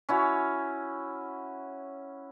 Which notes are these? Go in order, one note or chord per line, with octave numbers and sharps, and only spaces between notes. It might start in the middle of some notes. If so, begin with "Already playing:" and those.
C#4 E4 F#4